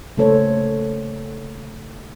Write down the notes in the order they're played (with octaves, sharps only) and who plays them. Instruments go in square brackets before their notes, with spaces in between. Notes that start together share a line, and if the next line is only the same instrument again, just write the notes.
[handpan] C#3 A3 A#3 A4 C5 C#5